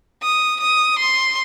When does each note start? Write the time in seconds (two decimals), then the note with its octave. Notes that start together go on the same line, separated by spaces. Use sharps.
0.23 D#6
0.61 D#6
0.99 C6